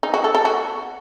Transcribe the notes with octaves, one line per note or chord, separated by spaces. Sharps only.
D#4
F#4
A4
A4
F#4